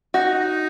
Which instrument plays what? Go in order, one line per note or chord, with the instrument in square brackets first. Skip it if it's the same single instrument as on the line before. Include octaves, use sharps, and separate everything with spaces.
[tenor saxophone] D#4 [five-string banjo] F#4